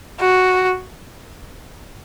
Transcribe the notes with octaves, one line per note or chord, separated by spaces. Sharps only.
F#4